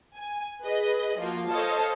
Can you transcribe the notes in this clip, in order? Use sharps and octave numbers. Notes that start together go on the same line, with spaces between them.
G#5
G#4 B4 D#5
F3 A#3 F4 F#4
A4 C5 C#5 D#5 F5 A5